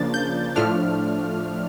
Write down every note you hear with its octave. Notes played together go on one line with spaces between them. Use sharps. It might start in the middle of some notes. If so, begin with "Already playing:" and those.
Already playing: C#3 F3 A#3 D4 A6
G6
A2 F3 A3 D4 F6